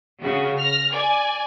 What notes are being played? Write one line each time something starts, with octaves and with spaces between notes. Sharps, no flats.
C#3 F#4
F6 A#6
D5 G#5